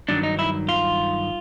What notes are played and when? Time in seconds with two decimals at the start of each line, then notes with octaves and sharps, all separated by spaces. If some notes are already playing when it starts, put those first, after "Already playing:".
0.09 G2 D#3 F#3 D4
0.23 D#4
0.39 E4
0.69 F4